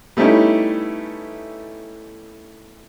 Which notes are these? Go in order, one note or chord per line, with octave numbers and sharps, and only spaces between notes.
G3 A3 B3 C#4 D#4 E4